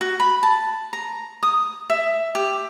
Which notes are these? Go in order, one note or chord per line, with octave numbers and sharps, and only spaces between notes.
F#4
B5
A5
A#5
D#6
E5
G4